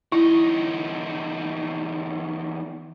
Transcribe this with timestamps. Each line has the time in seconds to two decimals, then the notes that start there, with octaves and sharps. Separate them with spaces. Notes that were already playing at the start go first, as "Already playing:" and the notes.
0.12 E2 D#4 E4